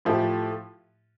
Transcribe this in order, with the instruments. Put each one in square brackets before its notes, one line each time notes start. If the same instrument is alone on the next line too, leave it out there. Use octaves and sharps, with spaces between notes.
[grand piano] A2 F3 A3 E4 G4